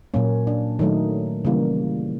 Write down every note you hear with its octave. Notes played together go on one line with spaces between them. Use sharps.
A#2 F#3 A#3 C#4
D4
D#3 F#3 A3 D#4
C#3 E3 G3 A#3